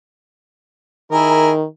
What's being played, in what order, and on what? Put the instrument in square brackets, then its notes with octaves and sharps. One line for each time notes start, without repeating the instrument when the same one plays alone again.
[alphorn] D#3 [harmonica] E4 G#4 A#4